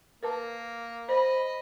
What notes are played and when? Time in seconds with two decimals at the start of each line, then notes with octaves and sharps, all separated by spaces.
0.23 A#3 A#4 B4 A5
1.09 C5 D#5 B5